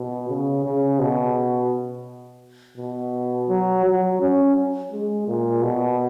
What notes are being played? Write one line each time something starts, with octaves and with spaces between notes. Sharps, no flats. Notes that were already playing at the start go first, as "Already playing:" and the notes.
Already playing: B2
C#3
C#3
B2
B2
F#3
F#3
C#4
G#3
A#2
B2